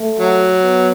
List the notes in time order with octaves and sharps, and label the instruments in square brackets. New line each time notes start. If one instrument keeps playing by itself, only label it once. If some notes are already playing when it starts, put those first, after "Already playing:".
Already playing: [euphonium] A3
[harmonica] F#3
[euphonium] B3